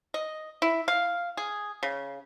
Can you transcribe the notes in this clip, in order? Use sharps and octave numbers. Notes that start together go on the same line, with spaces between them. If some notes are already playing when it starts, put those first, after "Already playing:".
D#5
E4
F5
G#4
C#3